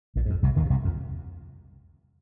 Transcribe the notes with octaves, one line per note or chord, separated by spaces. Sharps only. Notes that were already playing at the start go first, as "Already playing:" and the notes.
A#1 A#2
G#2
F2
C2 C3
D#2 D#3
A#2
C2 C3
F2